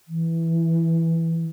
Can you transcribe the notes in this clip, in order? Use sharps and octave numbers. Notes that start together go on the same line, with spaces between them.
E3